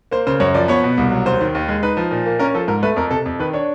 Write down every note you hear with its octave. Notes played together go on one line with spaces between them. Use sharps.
A#3 C5
C#3 C5
F#2 C#5
F3 D5
B3 C#5
B2
C2
F#3
D#2 C5
D#3
D#2
G#3
D#4 B4
F3
A#2
A#3
C#4 A#4
F3 A4
G#2 A#4
A3 B4
F2 A#4
C3 A4
F2
D#3 B4
D4 C#5